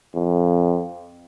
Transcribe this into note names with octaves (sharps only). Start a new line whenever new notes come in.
F2